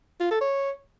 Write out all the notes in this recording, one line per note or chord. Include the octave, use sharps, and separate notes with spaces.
F4
A4
C#5